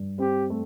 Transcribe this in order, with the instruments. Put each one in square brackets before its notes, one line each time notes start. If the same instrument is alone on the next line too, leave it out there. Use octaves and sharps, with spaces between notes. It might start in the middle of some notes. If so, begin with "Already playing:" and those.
Already playing: [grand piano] G2
[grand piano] C4 [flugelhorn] G4
[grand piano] A3